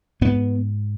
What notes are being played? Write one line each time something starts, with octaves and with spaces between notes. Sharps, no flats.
G#2 B3